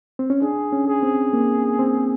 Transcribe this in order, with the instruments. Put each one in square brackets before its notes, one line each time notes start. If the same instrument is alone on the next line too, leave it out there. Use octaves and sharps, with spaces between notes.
[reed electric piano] C4
C#4
[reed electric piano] D4 [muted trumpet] G#4
[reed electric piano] C#4
[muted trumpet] G#4
[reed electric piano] C4
A#3
C4